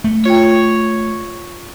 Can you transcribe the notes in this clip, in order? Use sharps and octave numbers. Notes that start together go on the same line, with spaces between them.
A3
F4 C#5 G5